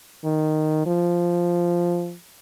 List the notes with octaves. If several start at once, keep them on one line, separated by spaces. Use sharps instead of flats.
D#3
F3